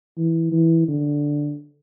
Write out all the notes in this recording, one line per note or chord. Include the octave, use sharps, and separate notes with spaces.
E3
E3
D3